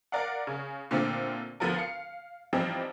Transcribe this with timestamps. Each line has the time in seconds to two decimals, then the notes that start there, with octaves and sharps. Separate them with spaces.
0.12 A#4 D5 F5 F#5
0.47 C#3
0.91 A#2 D3 A3 C4 F4 A4
1.60 D2 F3 B3 A4 A#4
1.76 F5 C#7
2.53 E3 F3 G3 C4 D#4 G4